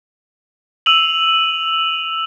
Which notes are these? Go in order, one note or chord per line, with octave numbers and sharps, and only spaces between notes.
E6 D#7 F7 F#7